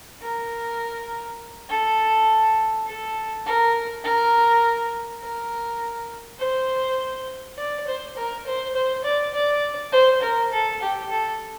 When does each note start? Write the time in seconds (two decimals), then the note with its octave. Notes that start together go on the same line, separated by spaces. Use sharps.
0.21 A#4
1.69 A4
2.86 A4
3.46 A#4
4.04 A#4
5.21 A#4
6.39 C5
7.58 D5
7.87 C5
8.16 A#4
8.46 C5
8.75 C5
9.04 D5
9.34 D5
9.92 C5
10.22 A#4
10.52 A4
10.81 G4
11.09 A4